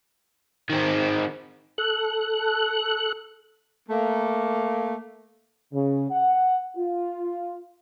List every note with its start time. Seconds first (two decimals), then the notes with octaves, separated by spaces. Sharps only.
0.70 D#3 C4
1.78 A4 F#6
3.89 A3 A#3
5.73 C#3
6.11 F#5
6.77 F4